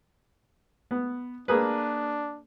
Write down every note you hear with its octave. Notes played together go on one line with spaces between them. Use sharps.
B3
A#3 D4 G#4 B4